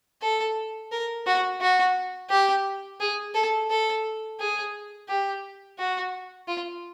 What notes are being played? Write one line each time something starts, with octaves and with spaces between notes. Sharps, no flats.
A4
A#4
F#4
F#4
G4
G#4
A4
A4
G#4
G4
F#4
F4